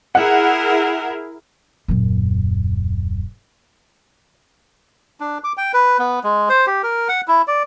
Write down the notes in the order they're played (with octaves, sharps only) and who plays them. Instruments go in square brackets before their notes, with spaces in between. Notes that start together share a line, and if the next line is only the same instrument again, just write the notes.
[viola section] E4 G#4 A#4 [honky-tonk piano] F#5
[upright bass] D#1 F#2
[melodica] D4
D6
G5
B4
B3
G#3
C5
G4
A#4
F#5
E4
D5